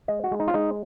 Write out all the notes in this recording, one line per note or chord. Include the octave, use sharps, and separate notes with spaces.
G#3 D#5
F#4
G#3
D#4
F4
G#3 D#4